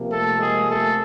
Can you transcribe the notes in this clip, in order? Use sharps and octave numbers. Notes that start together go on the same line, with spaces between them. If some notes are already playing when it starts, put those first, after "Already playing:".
Already playing: C3 F3 A#3
A3 A4
G#3 G#4
A3 A4